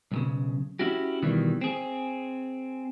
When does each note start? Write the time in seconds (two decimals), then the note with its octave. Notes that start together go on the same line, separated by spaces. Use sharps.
0.12 B1 A#2 C#3
0.79 C#4 E4 F#4 G4
1.22 B2 D#3 E3 G3
1.61 C4 G#4